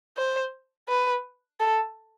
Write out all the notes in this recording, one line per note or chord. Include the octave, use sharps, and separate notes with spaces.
C5
B4
A4